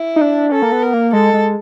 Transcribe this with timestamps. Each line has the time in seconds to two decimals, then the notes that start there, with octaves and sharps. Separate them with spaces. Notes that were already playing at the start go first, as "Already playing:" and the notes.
Already playing: E4
0.16 D#4
0.21 D4
0.51 C#4 A4
0.62 A#3
0.72 B3
0.82 A#4
0.93 A#3
1.13 G#3 A4
1.34 G#3